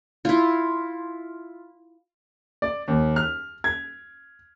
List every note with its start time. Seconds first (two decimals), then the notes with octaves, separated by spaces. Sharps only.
0.25 E4 F4
2.62 D5
2.88 D#2
3.16 F6
3.64 G#6